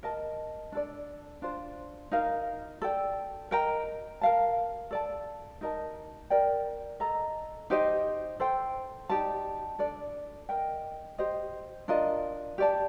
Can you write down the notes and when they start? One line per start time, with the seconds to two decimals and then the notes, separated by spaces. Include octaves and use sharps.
0.03 A#4 D#5 A5
0.72 D4 A4 D5
1.42 D4 F4 C5
2.12 D#4 A#4 F5
2.82 A4 D5 G5
3.51 A#4 D#5 G5 A#5
4.21 A#4 F5 A5
4.91 A4 D5 A5
5.61 D#4 A#4 D#5 A5
6.30 A#4 D5 G5
7.00 A4 D#5 A#5
7.70 D#4 G4 C5 D#5
8.40 A4 C5 G5
9.09 D#4 G4 D5 A5
9.79 D4 A4 D5
10.49 A#4 D#5 G5
11.18 G4 C5 D#5
11.88 D4 F4 A#4 D#5
12.58 G4 D5 A5